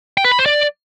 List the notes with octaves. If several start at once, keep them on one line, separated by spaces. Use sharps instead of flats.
G5
B4
B5
C5
D5